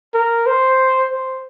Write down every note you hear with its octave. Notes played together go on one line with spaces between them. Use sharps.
A#4
C5
C5